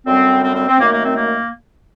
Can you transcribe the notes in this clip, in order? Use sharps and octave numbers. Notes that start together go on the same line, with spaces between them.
F#2 D3 G3 C4
C4
C4
C4
F#2 D#3 A3 A#3
A#3
C4
A#3